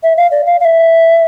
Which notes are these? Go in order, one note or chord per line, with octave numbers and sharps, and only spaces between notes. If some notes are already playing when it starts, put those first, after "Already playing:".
E5
F5
D5
F5
F5
E5